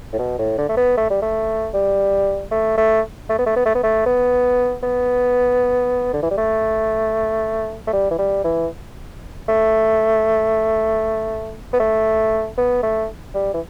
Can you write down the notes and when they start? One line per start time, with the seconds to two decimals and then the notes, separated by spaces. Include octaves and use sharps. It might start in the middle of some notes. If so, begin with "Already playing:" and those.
0.13 A2
0.19 B2
0.39 A2
0.58 D3
0.69 A3
0.77 B3
0.97 A3
1.10 G3
1.22 A3
1.74 G3
2.51 A3
2.78 A3
3.29 A3
3.38 B3
3.46 A3
3.56 B3
3.65 A3
3.75 B3
3.83 A3
4.06 B3
4.83 B3
6.13 D3
6.23 E3
6.31 G3
6.38 A3
7.87 A3
7.93 G3
8.11 E3
8.18 G3
8.44 E3
9.48 A3
11.73 B3
11.79 A3
12.58 B3
12.83 A3
13.34 G3
13.54 E3